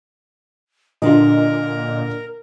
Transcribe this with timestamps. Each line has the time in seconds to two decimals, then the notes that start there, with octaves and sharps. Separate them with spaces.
1.02 A#2 D3 D4 F4 A#4 D#5